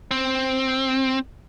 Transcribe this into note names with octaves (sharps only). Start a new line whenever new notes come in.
C4